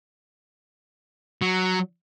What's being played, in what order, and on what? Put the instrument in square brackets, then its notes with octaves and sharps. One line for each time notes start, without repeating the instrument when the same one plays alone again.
[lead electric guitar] F#3